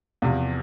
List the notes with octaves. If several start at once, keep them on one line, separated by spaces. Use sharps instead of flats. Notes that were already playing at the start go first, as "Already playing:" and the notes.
E2 C3 F3